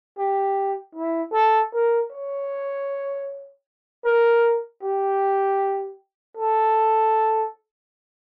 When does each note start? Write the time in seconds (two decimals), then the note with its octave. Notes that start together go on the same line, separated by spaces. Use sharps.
0.18 G4
0.95 E4
1.33 A4
1.73 A#4
2.11 C#5
4.04 A#4
4.83 G4
6.37 A4